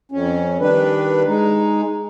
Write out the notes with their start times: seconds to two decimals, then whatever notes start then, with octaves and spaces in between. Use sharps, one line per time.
0.12 F2 C#4
0.60 D#3 G3 D4 B4
1.27 G#3 D#4